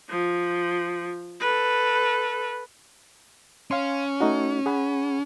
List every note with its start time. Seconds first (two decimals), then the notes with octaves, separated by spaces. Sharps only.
0.10 F3
1.41 A4 B4
3.71 C#4 F5 C6
4.20 A3 D#4 F#4
4.66 G#4 F#5 B5